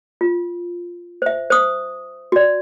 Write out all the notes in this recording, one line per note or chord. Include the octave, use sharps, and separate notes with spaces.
F4
C5 E5
C5 D#6
F#4 D5